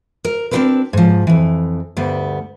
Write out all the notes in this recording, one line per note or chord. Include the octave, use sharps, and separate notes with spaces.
A#4
C4 D4 D#4 F4 A#4 B4
G#2 F3
F2 E3
D2 G2 G3 B3